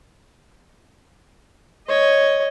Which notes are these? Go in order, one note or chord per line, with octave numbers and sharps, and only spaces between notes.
C#5 D#5